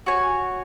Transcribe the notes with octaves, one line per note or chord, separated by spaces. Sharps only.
F#4 C#5 G#5